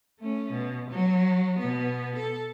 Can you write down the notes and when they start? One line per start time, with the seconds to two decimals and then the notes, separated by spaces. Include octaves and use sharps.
0.20 A3 C#4
0.52 B2
0.90 F#3
1.59 B2 B3
2.16 A4